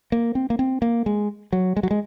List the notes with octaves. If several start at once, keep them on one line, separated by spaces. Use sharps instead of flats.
A#3
C4
A#3
C4
A#3
G#3
F#3
G#3
F#3
G#3